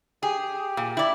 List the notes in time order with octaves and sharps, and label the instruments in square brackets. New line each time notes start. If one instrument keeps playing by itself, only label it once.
[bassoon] G4 [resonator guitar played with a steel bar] G#4
[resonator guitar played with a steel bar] A#2
E4 D5